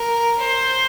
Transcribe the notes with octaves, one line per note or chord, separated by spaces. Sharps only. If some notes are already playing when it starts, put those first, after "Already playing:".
Already playing: A#4
C5